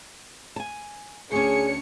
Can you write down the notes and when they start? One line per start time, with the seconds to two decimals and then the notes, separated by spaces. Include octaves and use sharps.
0.56 G#5 A5
1.32 D2 C#4 D4 G#4 C#5 C#7